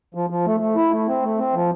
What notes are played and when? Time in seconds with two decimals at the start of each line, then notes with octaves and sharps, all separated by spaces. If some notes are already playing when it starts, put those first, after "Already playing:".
0.15 F3
0.30 F3
0.46 A3
0.60 A3
0.76 E4
0.91 A3
1.07 C4
1.22 A3
1.38 C4
1.54 F3